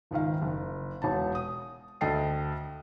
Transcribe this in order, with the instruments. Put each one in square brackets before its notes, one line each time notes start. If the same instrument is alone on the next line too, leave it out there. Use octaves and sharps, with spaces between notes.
[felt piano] C#2 G#2 D#3 F5
F#1
E1 C#5 A5
D#6
D2 A4 D#5 G5 A5 C7